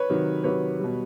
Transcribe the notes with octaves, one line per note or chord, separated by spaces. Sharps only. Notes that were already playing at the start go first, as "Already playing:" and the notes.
Already playing: B4 C#5
C3 D#3 F#3
C3 D#3 F#3 B4 C#5
B2 G3